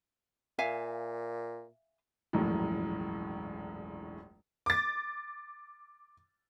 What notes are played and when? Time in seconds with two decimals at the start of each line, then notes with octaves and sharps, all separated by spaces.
0.59 A#2 E5 F5 G#5
2.33 E1 A#1 F#2 A2
4.66 D6 A6